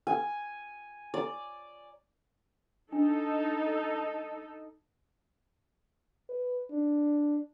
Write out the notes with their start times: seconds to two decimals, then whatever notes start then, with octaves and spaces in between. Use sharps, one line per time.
0.07 G#5
1.14 D5
2.92 D4 D#4 A4
6.29 B4
6.71 D4